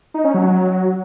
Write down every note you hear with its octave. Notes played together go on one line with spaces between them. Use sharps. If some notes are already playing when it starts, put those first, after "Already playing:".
D#4
C#4
F#3